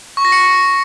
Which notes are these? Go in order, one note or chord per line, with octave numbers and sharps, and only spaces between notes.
C#6
A#6
C#7